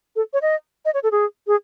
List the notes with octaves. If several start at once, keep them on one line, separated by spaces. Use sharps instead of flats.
A4
C#5
D#5
D#5
C#5
A4
G#4
G#4